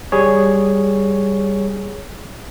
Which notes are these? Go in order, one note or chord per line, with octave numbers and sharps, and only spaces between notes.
G3 G#4 C#5